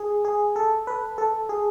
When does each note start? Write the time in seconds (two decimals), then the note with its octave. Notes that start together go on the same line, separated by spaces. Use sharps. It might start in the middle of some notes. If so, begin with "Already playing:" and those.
Already playing: G#4
0.25 G#4
0.56 A4
0.87 B4
1.18 A4
1.49 G#4